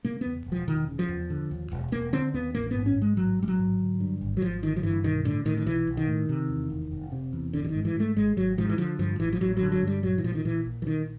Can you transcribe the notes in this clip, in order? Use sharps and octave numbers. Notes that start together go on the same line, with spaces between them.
C#3 A#3
E2 B3
E1
F3
E1 D#3
C#3
F3
E2
D3
D#2
E1
E1 A#3
D3 C4
D#2 B3
A1 A#3
G#2 B3
C#4
G#2
G#3
A1 F#3
A1 G3
F#3
G#2
D3
G2
G#1
F#3
G#1 F3
D3 D#3
F3
G2 E3
B1 D#3
A2 D3
A2 D#3
D#3
B1 E3
B1
D#3
A2
C3
E2
F1
F1
C3
E2
G#1 D3
D3
D#3
G#2
E3
G#2 A3
G#1 G#3
G#1 F#3
G#2 F3
E3
D3 F3
G2 F3
A1 E3
F3
A1 F#3
D3 F#3
F#3
G2
G3
A#1 F#3
E3
A#2 F3
D#3
A#2 E3
A#1
E3
A#1 D#3